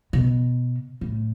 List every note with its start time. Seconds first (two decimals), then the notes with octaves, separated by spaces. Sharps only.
0.13 B2
1.01 A2